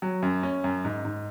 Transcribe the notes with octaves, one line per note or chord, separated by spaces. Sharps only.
F#3
F#2
C#4
F#2
G#2
G#2